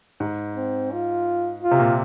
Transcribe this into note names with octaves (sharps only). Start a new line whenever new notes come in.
G#2
C4
F4
F4
C3
A#2